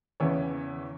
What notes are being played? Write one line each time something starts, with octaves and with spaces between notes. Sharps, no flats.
E2 C#3 E3 C#5